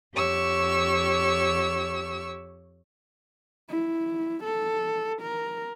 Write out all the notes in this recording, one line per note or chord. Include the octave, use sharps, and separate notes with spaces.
F2 G4 C#5 C#6 E6
E4
A4
A#4